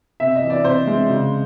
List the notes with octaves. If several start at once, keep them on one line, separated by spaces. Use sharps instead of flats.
C3 E5
D#5
E3
D5
C3 C5
G#3
C#3